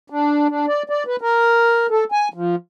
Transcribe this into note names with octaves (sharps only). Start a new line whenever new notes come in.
D4
D4
D5
D5
B4
A#4
A4
G#5
F3